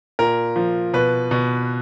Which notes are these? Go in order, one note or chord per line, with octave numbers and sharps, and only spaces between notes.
A#2 A#4
F3
B2 B4
B2